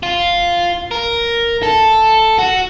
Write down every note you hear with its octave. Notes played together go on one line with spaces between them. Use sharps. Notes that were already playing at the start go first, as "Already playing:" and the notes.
F4
A#4
A4
F#4